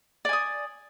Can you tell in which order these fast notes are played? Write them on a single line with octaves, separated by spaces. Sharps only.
D5 G#5 D#6